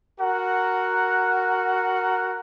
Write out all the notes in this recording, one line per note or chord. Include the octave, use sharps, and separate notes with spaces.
F#4 A#4 F#5 A#5